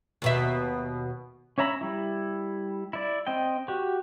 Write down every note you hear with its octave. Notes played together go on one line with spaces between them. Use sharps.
D#2 B2 E5
C#4 C#5 E5 A#5 B5
G3 E4
E4 D5
C4 D#5 G5
F#4 G4